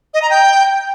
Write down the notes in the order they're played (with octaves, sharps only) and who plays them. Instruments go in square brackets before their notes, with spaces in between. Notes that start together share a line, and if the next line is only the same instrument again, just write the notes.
[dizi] D#5
A#5
G5